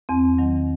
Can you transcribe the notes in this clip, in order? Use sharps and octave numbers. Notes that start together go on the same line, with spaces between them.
E2 C4
D#3 F#3